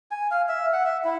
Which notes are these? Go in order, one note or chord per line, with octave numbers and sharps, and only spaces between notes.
G#5
F5
E5
F#5
E5
E4